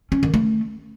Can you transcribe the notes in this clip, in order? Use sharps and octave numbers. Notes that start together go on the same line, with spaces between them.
C#4
D#3
A3